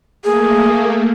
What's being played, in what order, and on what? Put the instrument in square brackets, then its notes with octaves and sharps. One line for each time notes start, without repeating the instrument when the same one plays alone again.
[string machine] A3 A#3 [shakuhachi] G#4